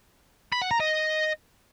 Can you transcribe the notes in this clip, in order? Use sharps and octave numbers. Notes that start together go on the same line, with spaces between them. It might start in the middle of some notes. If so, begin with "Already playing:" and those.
B5
F#5
A#5
D#5